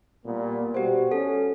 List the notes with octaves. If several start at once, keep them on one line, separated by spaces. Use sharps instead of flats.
A#2 G3 B3
B2 G3 F#4 G4 C5
C#4 A4